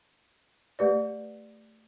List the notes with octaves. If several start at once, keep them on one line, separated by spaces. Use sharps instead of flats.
A3 G4 B4 D5